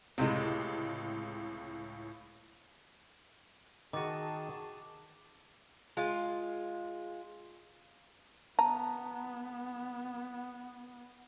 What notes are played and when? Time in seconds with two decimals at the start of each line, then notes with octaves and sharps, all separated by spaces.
0.18 C#2 A2 C3 G#3
3.93 D#3 F#4 G#4 A5 D6 A6 D#7
5.97 G#3 F4
8.59 B3 A5 A#5